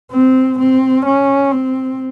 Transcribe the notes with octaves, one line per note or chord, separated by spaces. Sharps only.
C4
C4
C#4
C4